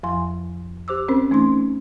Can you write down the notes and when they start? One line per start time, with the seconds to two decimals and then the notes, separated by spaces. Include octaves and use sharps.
0.03 F2 F3 G#5 C6
0.88 G4 C5 D6 E6
1.08 C4 C#4 A#4 C5
1.30 E3 A3 C#4 D#4 C6